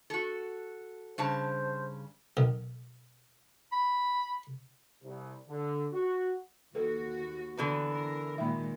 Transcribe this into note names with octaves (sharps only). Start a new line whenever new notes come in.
F#4 A4
G2 C#3 C5 A5
B1 D#3
B5
C2
D3
F#4
D#2 F#4 A4 B4
D3 E3 B3
E4 A#4
A#2 D#3 G#3 E5 G5 B5